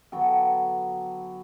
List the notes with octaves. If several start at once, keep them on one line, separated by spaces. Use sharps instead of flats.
D3 F#3 B3 G5